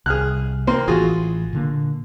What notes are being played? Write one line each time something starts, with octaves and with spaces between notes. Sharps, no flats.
C2 G#4 F6 F#6
A#3 C4 C6
A1 E3 F4 F#4 G#4
A#2 D3 A#3